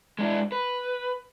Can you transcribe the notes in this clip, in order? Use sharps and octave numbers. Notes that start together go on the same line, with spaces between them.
G#3 D4 E4
B4